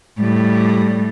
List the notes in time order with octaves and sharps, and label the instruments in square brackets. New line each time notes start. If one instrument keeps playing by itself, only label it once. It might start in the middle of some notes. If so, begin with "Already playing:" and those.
[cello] A2 G3